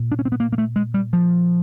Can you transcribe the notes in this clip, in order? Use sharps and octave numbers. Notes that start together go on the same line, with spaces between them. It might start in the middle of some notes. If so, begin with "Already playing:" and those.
Already playing: A#2
D4
C#4
C4
B3
A#3
A#3
A3
G#3
G3
F3